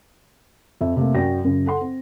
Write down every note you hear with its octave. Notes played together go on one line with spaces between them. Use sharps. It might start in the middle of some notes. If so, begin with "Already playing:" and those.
F2 E5
C3 A3 A#3
F#2 F#4 D5 G5 A#6
F#2 C#3
A4 F#5 C6
C4